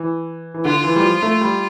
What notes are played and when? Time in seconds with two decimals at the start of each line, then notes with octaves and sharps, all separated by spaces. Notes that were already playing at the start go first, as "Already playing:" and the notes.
Already playing: E3
0.54 E3
0.65 D3 F4
0.84 E3
0.96 G3
1.02 F3
1.22 A3
1.41 G3